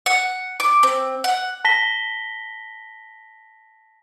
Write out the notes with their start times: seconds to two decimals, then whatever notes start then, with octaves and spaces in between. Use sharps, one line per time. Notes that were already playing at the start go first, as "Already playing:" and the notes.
0.06 F#5
0.60 D6
0.83 C4
1.24 F#5
1.65 A5 A#6 B6 G7